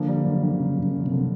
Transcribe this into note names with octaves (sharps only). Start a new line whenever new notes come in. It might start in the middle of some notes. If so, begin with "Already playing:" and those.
Already playing: D3 F3 A#3
G3
F#2
G3
F#2 C#3
F#2
C#3
F#2
C3
D3